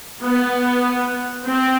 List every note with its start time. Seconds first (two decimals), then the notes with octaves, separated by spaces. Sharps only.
0.21 B3
1.46 C4